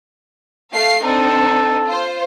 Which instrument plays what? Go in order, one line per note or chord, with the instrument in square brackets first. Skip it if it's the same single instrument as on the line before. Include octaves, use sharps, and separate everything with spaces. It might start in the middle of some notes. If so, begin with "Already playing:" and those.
[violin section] A3 F5 C7
[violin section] C4 D4 D#4 [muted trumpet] A4
[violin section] F4 C5